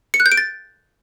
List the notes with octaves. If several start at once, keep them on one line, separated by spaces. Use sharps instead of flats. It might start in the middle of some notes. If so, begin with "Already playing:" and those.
C#7
F#6
G6
D7
A6